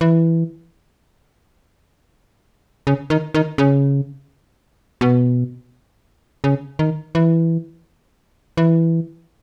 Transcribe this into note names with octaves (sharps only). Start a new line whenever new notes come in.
E3
C#3
D#3
D#3
C#3
B2
C#3
D#3
E3
E3